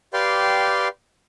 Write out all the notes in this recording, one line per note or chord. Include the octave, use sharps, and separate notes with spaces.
G4 B4 D5 F5 G5 C6